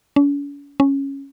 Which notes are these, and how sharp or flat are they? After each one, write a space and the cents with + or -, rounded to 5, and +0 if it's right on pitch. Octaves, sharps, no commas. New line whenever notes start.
C#4 +45
C#4 -5